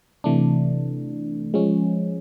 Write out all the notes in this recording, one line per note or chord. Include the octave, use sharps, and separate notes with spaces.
C3 E3 A3 D4
F3 G#3 C#4